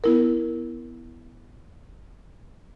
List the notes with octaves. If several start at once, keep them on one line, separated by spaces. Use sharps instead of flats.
B3 E4 A#4